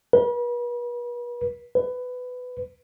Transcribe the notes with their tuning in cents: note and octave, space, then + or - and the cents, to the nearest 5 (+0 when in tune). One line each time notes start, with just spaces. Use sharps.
B4 -40
B4 +15